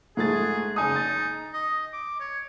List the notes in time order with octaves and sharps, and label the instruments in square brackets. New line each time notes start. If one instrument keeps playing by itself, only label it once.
[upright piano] G#2 A3 A6 [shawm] G#4
[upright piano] F#1 G#5 D#6 [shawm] D#4
[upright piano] A6
[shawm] D#5
D6
C#5